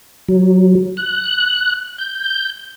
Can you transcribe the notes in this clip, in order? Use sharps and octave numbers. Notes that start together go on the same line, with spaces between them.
F#3
F#6
G6